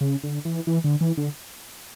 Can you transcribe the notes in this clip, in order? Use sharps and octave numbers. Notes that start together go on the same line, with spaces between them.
C#3
D3
E3
E3
D3
E3
D3